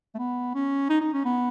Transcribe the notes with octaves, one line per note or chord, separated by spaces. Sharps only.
A3
B3
C#4
D#4
D#4
C#4
B3